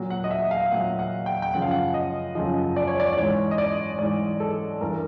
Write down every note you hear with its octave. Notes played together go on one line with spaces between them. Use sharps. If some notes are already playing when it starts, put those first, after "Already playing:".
Already playing: A#2 F#3
F#5
D#5
E5
F5
A#2 F#3 F#5
F#5
G5
G5
F#2 C#3 F3 F#5
F5
F#5
D#5
F#2 C#3 F3 D#5
D5
C#5
D5
D5
G#2 E3 C#5
D#5
D5
G#2 E3 D5
A4
G2 E3 A#4